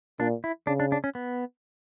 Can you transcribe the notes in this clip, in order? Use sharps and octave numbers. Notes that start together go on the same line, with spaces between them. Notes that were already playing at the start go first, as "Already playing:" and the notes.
A#2 D4
E4
C#3 D4
D4
D4
C#4
B3